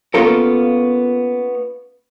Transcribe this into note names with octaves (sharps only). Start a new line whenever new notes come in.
A#3 B3 C#4 F4 A4 A#4